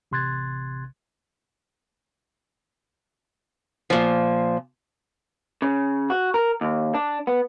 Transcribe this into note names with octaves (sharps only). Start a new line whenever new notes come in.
A1 C3 C6 F#6 G#6 A6
A#2 F3
C#3
F#4
A#4
D#2
D4
B3